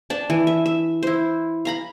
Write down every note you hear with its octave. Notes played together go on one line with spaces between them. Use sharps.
D4 D5 A5
E3
E5
E5
E4 C5
F5 A#5 B5